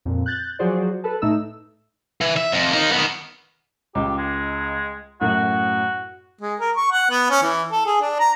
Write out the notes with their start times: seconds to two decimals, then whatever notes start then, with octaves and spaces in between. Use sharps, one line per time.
0.05 F2 A#2
0.26 F#6 G6 A6
0.59 F3 F#3 F#4 G#4 C5 D5
1.04 A4 B4 A5
1.22 A2 A3 D#4 E6
2.21 E3
2.36 E5
2.52 F2
2.72 A#3 D#4
2.92 D#3 B3
3.95 C#2 G4
4.18 G#3
5.21 F#2 A2 F#4
6.41 G#3
6.60 A#4
6.77 C#6
6.92 F#5
7.10 B3
7.30 C#4
7.43 E3
7.72 A4
7.86 G#4
8.01 D4
8.20 A#5